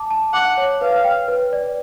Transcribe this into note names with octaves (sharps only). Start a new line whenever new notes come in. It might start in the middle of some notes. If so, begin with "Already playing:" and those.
Already playing: A5 D6
A5
F#5 D6
C#5
B4 F5
G5
B4
D5